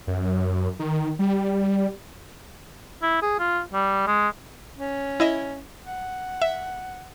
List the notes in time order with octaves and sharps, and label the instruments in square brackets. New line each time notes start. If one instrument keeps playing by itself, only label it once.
[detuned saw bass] F#2
D#3
G3
[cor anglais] E4
G#4
F4
G3
G#3
[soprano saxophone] C#4
[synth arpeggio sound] E4 D#5 E5
[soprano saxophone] F#5
[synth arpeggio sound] E5